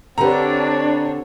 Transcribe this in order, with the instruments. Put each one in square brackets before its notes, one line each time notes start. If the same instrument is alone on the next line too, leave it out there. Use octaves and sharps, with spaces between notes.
[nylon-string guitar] D3 G4 [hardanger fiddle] C4 C#5 [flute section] D4 [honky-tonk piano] B4 A#5